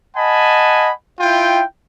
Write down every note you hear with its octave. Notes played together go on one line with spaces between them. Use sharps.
D#5 F#5 G#5 A5 B5
E4 F4 G5